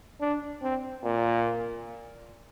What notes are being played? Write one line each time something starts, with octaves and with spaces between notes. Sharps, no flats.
D4
C4
A#2